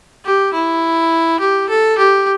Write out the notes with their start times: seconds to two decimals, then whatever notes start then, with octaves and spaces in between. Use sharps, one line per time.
0.25 G4
0.53 E4
1.40 G4
1.69 A4
1.98 G4